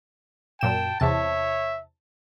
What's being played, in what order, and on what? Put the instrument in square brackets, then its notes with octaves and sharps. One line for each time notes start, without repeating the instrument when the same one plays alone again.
[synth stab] F#2 A#2 E7 [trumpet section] G5 A5
[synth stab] E2 C3 A5 [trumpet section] C#5 E5